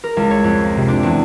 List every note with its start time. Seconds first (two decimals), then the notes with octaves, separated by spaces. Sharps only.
0.04 A#4
0.17 C#2
0.30 C#5
0.44 F2
0.65 A#3
0.77 C3
0.88 D4
1.03 E2